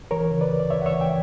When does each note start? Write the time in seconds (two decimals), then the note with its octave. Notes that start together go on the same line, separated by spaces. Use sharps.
0.11 E3 A#4 C#5
0.31 C#3
0.41 B4 D5
0.52 D2
0.60 D5
0.70 D2 C#5 E5
0.82 F#5
0.86 C#5 E5
0.91 E3
1.00 E5 G5